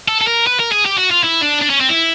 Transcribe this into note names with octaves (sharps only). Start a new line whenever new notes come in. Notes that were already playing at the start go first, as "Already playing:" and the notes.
A4
A4
A#4
B4
A#4
G#4
G4
F#4
F4
E4
D4
D4
C#4
C4
E4